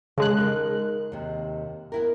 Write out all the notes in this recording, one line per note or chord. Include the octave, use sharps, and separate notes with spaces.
C#3 G#3 A5 F#6
D#4 A#4
D#2 C3
B3 E4 A#4